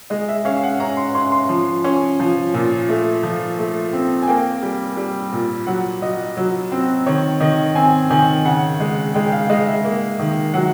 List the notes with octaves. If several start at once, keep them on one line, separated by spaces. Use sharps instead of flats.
G#3 D#5
E5
C#4 F5
F#5
C#4 A#5
C6
C#4 C6
C6
F3
C#4
F3
A#2
A3
F3
A3
C4
G#5
A#3 G5
G3
G3
A#2
F#3 F#5
F#3 D#5
F#3
C4
D#3 C#5
D#3 D#5
C4 G#5
D#3 G#5
C#3 F#5
G#3
G#3 G5
F5
G#3 D#5
E5
A#3
D#3
F#3 F#5